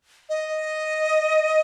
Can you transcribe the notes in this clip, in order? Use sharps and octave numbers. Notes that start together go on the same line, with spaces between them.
D#5